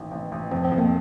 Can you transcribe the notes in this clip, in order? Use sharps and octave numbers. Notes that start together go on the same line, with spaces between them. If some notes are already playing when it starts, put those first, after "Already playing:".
Already playing: A1 D#3
A1
A1
F2 C4
C4
F2
A#3